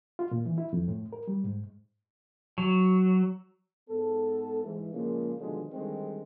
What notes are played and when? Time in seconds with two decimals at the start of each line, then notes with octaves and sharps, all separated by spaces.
0.19 F4
0.31 A#2
0.46 E3
0.58 E4
0.73 F2
0.88 A2
1.13 A#4
1.28 G3
1.44 G#2
2.58 F#3
3.89 G#2 B3 A4
4.63 G#2 E3
4.93 A#2 C#3 F3 G#3 A#3
5.39 B2 D3 D#3 F3 G3 G#3
5.72 D3 D#3 G3 G#3 C4